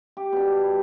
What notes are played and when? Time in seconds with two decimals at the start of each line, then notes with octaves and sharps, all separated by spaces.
0.17 G4
0.33 B2 D4
0.64 G3